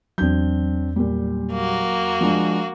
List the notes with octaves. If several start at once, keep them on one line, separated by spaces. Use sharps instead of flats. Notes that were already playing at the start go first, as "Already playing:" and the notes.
E2 F#3 C4 D4 G6
A#2 G3
A#3 F#4
F3 G#3 D4